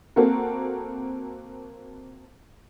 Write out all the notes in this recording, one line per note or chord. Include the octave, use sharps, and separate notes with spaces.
A#3 C4 F#4 A4 A#4